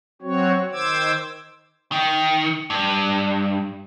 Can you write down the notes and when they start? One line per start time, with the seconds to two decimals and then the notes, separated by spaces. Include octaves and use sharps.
0.22 F#3 C4 F#4 C#5
0.72 D#3 C5 D6 E6 G#6
1.92 D#3
2.70 G2